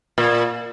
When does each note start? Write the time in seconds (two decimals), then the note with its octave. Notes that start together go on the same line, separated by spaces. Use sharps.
0.18 A#2